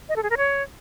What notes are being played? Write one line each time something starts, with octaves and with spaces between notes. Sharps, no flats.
D#5
A4
G#4
A#4
C#5